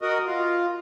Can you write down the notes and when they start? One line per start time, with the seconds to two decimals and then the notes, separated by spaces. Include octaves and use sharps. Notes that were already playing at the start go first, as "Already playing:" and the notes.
0.02 F#4 A#4 D#5
0.26 F4